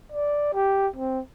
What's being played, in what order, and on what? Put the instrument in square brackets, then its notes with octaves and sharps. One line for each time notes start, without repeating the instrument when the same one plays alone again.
[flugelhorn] D5
G4
C4